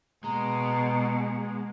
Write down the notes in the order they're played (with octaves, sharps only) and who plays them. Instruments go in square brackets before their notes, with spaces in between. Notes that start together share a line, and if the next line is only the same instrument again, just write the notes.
[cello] B2 [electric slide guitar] G#3 [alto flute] A#5